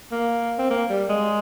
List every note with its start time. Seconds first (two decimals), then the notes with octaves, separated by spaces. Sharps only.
0.12 A#3
0.58 C4
0.70 A#3
0.90 G3
1.09 G#3